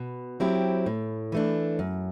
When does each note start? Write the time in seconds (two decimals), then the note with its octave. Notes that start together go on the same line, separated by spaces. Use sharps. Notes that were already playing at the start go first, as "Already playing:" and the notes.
Already playing: B2
0.40 F#3 C4 E4 G4
0.86 A2
1.32 E3 A3 D4
1.79 F#2